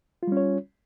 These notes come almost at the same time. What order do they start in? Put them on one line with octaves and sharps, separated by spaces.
F4 G3 C#4 C#5